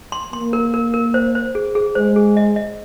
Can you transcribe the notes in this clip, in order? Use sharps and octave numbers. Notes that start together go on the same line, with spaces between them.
C6
A#3 C6
A#4
A#4
A#4
C5
C5
G#4
G#4
G#3 C5
G#4
D#5
D#5